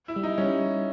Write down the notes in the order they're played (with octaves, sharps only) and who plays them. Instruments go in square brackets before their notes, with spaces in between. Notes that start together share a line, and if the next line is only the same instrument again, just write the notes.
[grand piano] E4
[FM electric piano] G3
[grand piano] D#4
[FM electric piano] G3 [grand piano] C#4